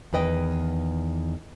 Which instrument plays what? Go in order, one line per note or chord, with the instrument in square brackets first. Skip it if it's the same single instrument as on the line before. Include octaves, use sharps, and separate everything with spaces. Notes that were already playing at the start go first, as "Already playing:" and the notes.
[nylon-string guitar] E2 D#3 B4 D#5 G5